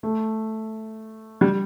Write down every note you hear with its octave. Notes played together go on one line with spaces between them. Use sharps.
A3
G3